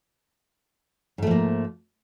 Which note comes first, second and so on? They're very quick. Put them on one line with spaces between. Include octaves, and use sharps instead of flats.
G#2 A3 F3 A#3